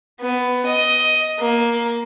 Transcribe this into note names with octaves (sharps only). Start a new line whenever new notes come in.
B3
D#5
A#3